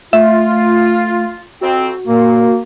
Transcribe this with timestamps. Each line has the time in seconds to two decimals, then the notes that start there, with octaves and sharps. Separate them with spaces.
0.13 A3 F4 E5
1.61 F2 C4 F#4
2.08 A#2 A#3